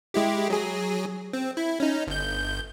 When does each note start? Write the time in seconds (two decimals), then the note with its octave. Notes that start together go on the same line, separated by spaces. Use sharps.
0.14 G#3 E4 G4
0.50 F#3 G#4
1.33 C4
1.57 E4
1.80 C#4 D#4
2.07 G1 G6